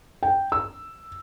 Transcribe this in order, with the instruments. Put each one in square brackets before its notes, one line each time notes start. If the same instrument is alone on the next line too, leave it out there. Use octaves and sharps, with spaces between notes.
[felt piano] G5
E6